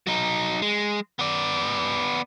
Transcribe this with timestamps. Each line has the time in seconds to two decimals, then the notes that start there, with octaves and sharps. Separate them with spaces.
0.07 F#3 D#4
0.62 G#3
1.19 B3 D5